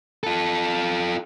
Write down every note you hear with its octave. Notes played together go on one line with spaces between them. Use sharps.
F4 A4